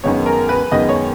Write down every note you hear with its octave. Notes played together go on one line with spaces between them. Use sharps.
F#2 D#3 G#3 B3 C#5
A#4
B4
F#2 D#3 G#3 B3 D#5
C#5